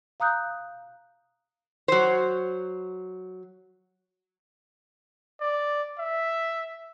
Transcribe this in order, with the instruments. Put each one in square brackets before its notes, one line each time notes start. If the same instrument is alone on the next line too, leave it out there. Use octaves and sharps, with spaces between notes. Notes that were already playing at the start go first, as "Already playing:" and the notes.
[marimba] F5 A#5 D#6 F#6 G6
[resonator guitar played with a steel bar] F#3 C5
[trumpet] D5
E5